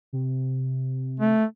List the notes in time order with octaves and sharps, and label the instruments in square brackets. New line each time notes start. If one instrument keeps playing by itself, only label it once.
[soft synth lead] C3
[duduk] A3